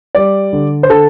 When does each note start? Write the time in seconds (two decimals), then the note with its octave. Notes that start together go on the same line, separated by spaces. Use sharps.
0.15 G3 D5
0.53 D3
0.83 C5
0.89 D3 A4